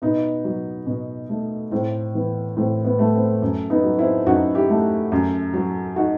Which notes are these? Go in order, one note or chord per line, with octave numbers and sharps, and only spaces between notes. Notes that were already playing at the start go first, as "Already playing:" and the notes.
B2 B3 D#4
F#3
B2
A3
A2 C4
E3 B3
A2 C4
B3
A3
C4
F#2
B3 D#4
F#3
C4 E4
F#2 D#4 F#4
E4 G4
A3
F#2
F#3
D#4 F#4